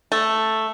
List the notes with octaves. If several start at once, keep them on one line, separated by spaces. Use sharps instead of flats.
A3